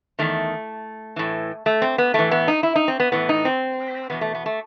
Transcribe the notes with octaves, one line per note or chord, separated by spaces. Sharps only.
E2 D#3 A3
A2 E3
A3
C4
B3
A2 E3 A3
B3
D#4
E4
D#4
C4
B3
A2 E3 B3
D#4
C4
E2 B2 B3
A3
B3
A3